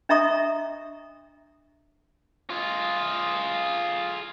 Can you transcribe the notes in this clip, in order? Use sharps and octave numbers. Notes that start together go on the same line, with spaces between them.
D4 D#5 E5 A#5 C#6 D#6
F4 G#4